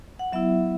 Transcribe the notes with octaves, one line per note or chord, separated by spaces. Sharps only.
F#5
F#3 B3 E4 E5